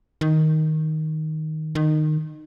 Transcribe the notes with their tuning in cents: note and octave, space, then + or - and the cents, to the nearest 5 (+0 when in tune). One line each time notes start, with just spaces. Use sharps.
D#3 +5
D#3 -20